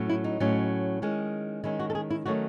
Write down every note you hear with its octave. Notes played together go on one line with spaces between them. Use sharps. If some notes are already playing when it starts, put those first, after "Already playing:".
Already playing: A2 F#3 C#4
E4
D#4
A2 F#3 C#4
D#3 G#3 C#4
D#3 G#3 C#4 E4
F#4
A4
G#4
E4
D#3 F#3 A3 C#4 F#4